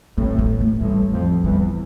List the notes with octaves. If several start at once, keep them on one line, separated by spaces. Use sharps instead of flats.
A1 A2 C4
B3
A3
A1 A2 G3
F2 F3
E2 E3 G3